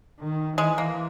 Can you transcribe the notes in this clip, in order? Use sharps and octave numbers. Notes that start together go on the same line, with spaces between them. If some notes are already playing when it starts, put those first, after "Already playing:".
D#3
E3 G#3
A#3